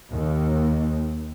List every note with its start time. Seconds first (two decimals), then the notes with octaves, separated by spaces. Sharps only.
0.11 D#2